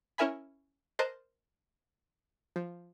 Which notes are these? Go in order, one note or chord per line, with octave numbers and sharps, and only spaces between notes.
C#4 E4 A#4 E5 G#5 B5
A#4 C5 D#5 A5 F#6 G6
F3